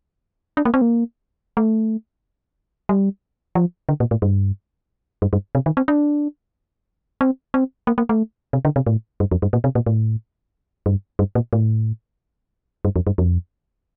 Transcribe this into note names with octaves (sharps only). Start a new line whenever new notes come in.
D4
A#3
C4
A#3
A3
G3
F3
D3
A#2
A2
G2
G2
G2
C3
D#3
C4
D4
C4
C4
A#3
A#3
A3
C3
D3
C3
A2
G2
F2
G2
A#2
C3
A#2
A2
G2
G2
A#2
A2
G2
F2
G2
F2